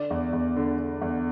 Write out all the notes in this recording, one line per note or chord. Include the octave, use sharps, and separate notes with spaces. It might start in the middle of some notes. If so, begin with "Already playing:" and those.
Already playing: D3 D5
E2
E2
D3
D3
E2